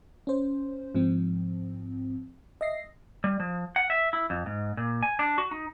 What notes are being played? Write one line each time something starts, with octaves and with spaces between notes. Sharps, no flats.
C#4 C5
G#2 F3 C4
D#5 E5 A#6 C7
G3
F3
F#5
E5
E4
F2
G#2
A#2
G#5
D4
F#4
D#4